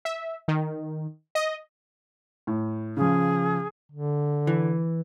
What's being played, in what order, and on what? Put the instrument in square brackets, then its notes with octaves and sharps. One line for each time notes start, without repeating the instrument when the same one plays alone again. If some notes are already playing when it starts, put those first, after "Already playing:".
[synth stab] E5
D#3
D#5
[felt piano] A2
[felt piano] C#3 F3 [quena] G#4
[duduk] D3
[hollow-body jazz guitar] E3